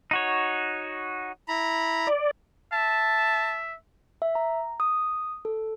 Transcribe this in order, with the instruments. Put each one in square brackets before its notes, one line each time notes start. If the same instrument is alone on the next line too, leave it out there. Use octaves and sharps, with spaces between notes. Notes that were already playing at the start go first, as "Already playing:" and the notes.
[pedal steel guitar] D#4 F#4 C#5
[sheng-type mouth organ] E4 A#5 B5
[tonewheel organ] D5
[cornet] E5 [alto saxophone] A5
[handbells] E5
A#5
D#6
A4